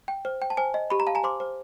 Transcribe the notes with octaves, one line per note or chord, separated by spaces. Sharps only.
G5
C5
G5
A5
C5 G#5
D#5
G4 B5
A#5
F5 A5
G#5 A#5
C5 C6 D6
C5